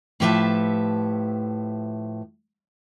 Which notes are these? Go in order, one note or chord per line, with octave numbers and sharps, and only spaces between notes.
A2 F3 G4 B4 E5 A5